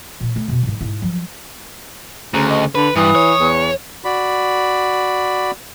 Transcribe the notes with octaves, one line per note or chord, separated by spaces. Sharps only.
A#2 E3
A3
F2 B2
G#2 E3
G#2 E4
F3 F#3
D2 C#3 A#5
D#5
D3 B4 B5
G2 E3 D#6
C#5
E2
F#4 D5 B5